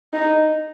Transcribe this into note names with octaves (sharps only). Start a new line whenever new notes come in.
D#4